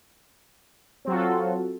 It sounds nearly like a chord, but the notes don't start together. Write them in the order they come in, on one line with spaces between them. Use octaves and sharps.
C4 F#3 F#4 F4 A4